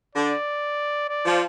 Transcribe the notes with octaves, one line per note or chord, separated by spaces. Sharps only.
D3 D5
D5
F3